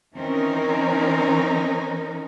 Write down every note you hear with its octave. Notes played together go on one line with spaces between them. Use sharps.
D#3 E3 C4 C#4 D#4 A#4